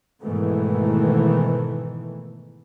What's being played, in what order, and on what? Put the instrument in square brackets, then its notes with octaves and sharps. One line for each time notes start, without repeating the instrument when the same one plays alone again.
[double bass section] G#2 B2 D#3 E3 A3